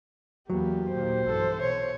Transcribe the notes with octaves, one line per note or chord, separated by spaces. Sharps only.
E2 F#3 A#3 B3 G4
D#2 A#2 A#3 C5
B1 G2 E3 A4
B2 C#5